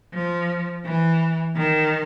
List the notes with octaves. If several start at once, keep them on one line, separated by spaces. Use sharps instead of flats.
F3
E3
D#3